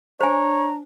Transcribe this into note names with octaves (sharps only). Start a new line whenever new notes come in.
D4 C5 C#5 G#5 A#5